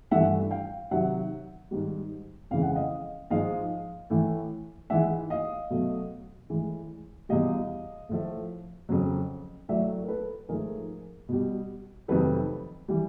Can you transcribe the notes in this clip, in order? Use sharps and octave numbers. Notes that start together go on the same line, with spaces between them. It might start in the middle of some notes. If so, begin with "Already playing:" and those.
G2 E3 A3 E5 F#5
F5 G5
C3 D#3 F#3 E5 F#5
G#2 D#3 G3
F2 C#3 E3 G#3 F5
F#5
D#5 F5
G#2 F3 G#3 D#5 F5
A2 E3 A3
G#2 E3 G#3 E5 F#5
D#5 F5
B2 F#3 A3
A2 E3 G#3
E2 B2 G3 D#5 F5
A2 F3 A3
F2 C#3 F#3
A2 F#3 A3 D5 E5
A#4
A4 B4
G#2 F3 A3 G#4 A#4
B2 G3
F2 C3 D#3 F#3 A3 A4 B4
E3 G3